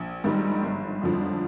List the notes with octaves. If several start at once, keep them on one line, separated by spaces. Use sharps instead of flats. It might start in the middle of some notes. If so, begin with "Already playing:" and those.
Already playing: A#1
G#2 D#3 G3
G1
F2 D3 F3